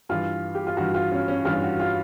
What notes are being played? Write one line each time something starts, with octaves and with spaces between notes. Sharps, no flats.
G2 E3 F4
G4
F4
G2 E3 F#4
F4
C#4
C#4
G2 E3 F4
F#4
F4